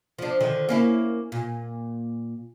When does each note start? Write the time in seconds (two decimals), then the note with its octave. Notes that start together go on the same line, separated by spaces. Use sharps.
0.19 F3 D4
0.40 D3 D#3 F3
0.69 A#3 C#4 E4
1.32 A#2